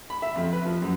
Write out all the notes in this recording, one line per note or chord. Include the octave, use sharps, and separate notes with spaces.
B5
E5
F2
B4
F3
F#2